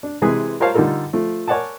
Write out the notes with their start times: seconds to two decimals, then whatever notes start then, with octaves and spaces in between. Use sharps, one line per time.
0.03 D4
0.22 C3 E3 G#3 G#4 B4
0.60 F4 A#4 C5 C#5 F5 A5
0.74 D3 G3 D#4 F4 A4 A#4
1.13 F3 A3
1.48 A#4 C#5 D5 F#5 G#5 A5